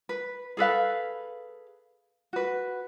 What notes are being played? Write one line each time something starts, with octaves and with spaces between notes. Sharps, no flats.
B4
G#4 A4 B4 F5
F#4 B4